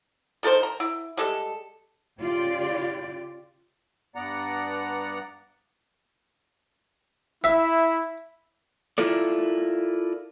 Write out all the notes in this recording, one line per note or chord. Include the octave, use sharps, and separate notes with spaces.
D#3 A4 A#4 C5
A#5
E4
G3 G#3 A4
C#3 F4 G4 D5
G2 B3 D5 F#5 A#5
E4 E5
E4 F4 A4 A#4 D5